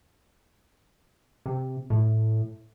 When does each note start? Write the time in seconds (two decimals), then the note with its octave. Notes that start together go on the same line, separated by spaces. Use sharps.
1.46 C3
1.90 A2